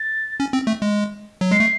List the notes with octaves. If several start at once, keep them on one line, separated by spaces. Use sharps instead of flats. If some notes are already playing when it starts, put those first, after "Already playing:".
Already playing: A6
C#4
C4
A3
G#3
F#3
G#3 C7
A3